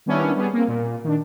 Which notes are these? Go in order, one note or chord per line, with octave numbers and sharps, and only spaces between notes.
D#3 G3 B3 C#4 D4 E4
G3 B3 G#4
A#3 C4
A#2
D#3 D4